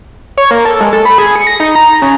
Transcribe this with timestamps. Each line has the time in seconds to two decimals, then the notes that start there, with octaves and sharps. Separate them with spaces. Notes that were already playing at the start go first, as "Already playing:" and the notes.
0.38 C#5
0.51 A#3
0.65 A4
0.81 G#3
0.93 A4
1.05 B5
1.18 G#4
1.36 C#7
1.47 A#6
1.60 D#4
1.75 A#5
2.02 C#3